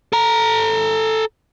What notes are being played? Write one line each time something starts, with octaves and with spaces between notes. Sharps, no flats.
A4 A#5